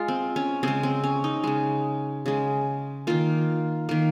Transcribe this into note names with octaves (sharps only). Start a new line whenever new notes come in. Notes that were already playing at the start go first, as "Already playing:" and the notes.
Already playing: G#3 F4
C4
C#4
C#3 G#3 C4
C4
C#4
D#4
C#3 G#3
C#3 G#3
D#3 A#3 F4
D#3 A#3